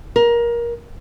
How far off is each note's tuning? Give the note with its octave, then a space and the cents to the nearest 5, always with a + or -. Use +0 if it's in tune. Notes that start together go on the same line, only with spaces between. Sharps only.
A#4 +20